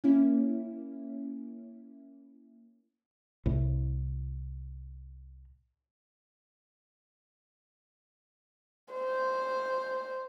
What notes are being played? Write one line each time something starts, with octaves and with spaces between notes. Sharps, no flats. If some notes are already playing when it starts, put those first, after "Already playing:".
A#3 C#4 E4
C2 A2
C5